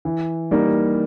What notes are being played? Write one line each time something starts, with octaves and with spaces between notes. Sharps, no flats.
E3
G3 A#3 D#4